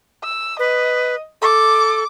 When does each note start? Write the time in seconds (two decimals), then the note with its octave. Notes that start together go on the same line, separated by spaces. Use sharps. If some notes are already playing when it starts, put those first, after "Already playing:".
0.24 E6
0.59 B4 D#5
1.42 A4 D6